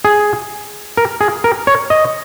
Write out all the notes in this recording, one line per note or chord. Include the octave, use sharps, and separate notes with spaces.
G#4
A#4
G#4
A#4
C#5
D#5